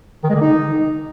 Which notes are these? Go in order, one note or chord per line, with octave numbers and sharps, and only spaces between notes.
D#3
G#3
D3
D#4